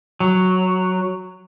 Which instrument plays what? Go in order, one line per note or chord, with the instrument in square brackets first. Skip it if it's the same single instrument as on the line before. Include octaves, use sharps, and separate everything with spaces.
[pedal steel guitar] F#3